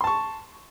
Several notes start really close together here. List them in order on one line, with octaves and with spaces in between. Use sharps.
C6 A5 C#6